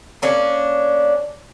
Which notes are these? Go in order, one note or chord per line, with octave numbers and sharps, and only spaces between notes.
A#3 C#4 D4